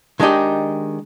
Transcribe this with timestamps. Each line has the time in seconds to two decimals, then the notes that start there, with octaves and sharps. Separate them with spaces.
0.20 D#3 G#3 D4 D#4 G4